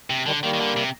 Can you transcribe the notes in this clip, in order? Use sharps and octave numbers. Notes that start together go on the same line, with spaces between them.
C3
D3 D#3 G3
D#3 G3 A#3
D#3
D3
C3